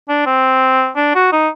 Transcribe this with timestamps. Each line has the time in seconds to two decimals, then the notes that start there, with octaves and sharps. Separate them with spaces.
0.09 D4
0.26 C4
0.96 D4
1.14 F#4
1.32 D#4